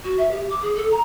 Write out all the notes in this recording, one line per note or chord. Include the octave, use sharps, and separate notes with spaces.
F#4
E5
G4
D6
G#4
A4
A#5